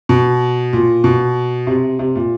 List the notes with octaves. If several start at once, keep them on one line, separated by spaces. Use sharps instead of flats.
B2
A#2
B2
C3
C3
A#2